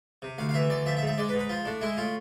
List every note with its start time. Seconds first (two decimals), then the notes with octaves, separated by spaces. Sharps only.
0.22 C3
0.38 D2 F5
0.49 F5
0.54 E3 E5
0.70 D2 D5
0.86 F3 E5
0.97 E5
1.02 G#2
1.07 E5
1.18 G#3 D5
1.29 B4
1.34 G#2
1.39 B4
1.49 F3 F4
1.65 A2 D4
1.81 G#3 E4
1.97 A2 F4